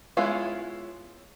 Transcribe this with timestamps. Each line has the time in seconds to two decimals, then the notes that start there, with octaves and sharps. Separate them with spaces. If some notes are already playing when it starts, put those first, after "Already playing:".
0.17 G#3 B3 C#4 E4 F4